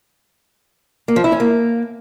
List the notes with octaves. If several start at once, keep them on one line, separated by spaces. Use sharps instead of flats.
A#3
F3
E4
C#4
A#3